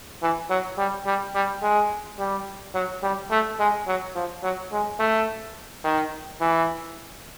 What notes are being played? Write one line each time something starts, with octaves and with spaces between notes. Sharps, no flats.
E3
F#3
G3
G3
G3
G#3
G3
F#3
G3
A3
G#3
F#3
F3
F#3
G#3
A3
D#3
E3